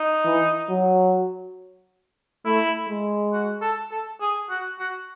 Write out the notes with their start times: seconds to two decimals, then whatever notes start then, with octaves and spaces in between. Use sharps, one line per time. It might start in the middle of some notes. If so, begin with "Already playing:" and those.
Already playing: D#4
0.25 E3
0.69 F#3
2.45 A3 E4
2.89 G#3
3.33 F#4
3.61 A4
3.91 A4
4.21 G#4
4.49 F#4
4.79 F#4